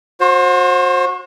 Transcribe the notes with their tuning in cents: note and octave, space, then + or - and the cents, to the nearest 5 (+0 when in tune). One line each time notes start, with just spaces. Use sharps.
F#4 -30 C5 +25